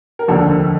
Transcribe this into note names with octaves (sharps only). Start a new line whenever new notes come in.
A#4
F1 D#2 D3 F3 A4